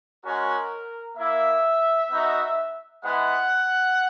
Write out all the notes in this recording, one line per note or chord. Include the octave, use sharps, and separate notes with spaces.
G#3 C#4 F#4 A#4
A#3 E4 E5
B3 D#4 F#4
G#3 B3 E4 F#5